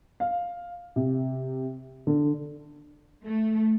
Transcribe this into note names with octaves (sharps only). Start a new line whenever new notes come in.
F5
C3
D3
A3